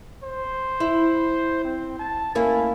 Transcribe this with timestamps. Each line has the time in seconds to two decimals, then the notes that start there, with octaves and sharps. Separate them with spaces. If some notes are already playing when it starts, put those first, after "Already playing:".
0.23 C5
0.80 E4
1.65 C4
1.99 A5
2.35 A#3 C#4 E4